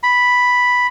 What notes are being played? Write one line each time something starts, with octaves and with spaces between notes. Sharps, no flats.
B5